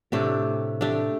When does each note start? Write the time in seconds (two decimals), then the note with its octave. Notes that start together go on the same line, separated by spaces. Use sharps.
0.12 A2 C3 A3 D4 G4
0.81 A3 D4 G4